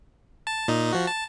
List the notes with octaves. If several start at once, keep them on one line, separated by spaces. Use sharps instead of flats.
A5
A#2 D#4
F3 F#4
A5